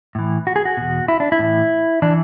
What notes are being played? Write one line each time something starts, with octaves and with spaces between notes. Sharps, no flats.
A2 E3
F#4
G#4
F#4
E2 B2
E4
D4
E4
A2 E3
E3 D4